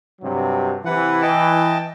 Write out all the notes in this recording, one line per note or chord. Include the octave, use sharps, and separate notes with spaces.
G2 C3 F#3
C3 E3 B4 F#5
D#5 G5 A5